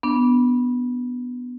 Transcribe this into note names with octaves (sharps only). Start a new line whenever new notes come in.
B3 D4